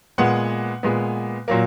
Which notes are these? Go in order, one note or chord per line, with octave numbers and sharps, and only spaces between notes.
A#2 G#3 B3 F#5
A#2 G#3 B3
A#2 F#3 A#3